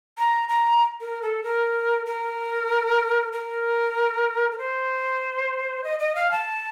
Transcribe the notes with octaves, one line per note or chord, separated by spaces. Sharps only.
A#5
A#5
A#4
A4
A#4
A#4
A#4
A#4
C5
D#5
D#5
F5
A5